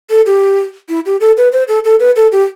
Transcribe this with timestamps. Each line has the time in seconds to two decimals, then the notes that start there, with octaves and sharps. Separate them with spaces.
0.10 A4
0.26 G4
0.89 E4
1.06 G4
1.20 A4
1.37 B4
1.52 C5
1.68 A4
1.84 A4
2.00 B4
2.16 A4
2.32 G4